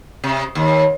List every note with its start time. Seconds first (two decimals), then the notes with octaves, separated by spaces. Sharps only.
0.24 C3
0.55 D#2